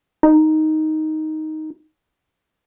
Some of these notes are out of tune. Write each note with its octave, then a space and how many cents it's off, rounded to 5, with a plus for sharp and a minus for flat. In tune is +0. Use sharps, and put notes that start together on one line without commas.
D#4 +5